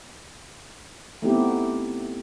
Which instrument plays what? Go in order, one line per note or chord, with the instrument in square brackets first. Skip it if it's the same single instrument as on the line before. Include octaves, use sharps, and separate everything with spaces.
[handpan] A3 B3 C4 D#4 E4 G4